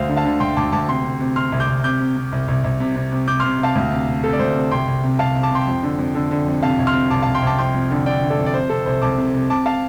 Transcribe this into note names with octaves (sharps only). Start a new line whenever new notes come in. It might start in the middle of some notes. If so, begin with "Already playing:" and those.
Already playing: D2 C5 F5
D3
F5 A5
D3
D2 G5 C6
D2 A5 D6
D2 A5 D6
C3 G5 C6
C3
C3
C3 C6 F6
C2
D6 G6
C2
C3 D6 G6
C3
C3
C2
C2
C2
C3
C3
C3
C3 D6 G6
C3 C6 F6
C3 F5 A5
D2
C3
C3
C3 A4
D5
D2 C5
C3
C2 G5 C6
C2
C3
C2 F5 A5
C3
A5 D6
C3 G5 C6
F2
D3
F2
D3
D3
F2
C3 F5 A5
C2
C6 F6
C3
C2 A5 D6
C2 F5 A5
G5 C6
C2 A5 D6
F2 G5 C6
F2
D3
D3 D5 G5
D3
A4 D5
F2
D5
C3 C5
C3 A4
C2 C5
C2 A5 D6
C3
C3
C3 A5 D6
F5 A5